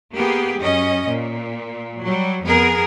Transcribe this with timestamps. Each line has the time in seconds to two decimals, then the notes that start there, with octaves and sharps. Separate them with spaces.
0.13 A#3 B3 G4 G#4
0.57 F#2 C#4 D#5
1.07 A#2
2.01 F#3 G3
2.45 F2 B3 G#4 A#4